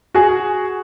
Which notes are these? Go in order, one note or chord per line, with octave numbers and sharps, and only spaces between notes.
F#4 G#4